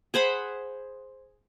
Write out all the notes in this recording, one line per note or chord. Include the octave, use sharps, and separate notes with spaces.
G#4 C5 F#5 B5